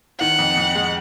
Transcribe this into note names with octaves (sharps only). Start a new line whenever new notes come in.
D#3 F#5
F2
F2
G#3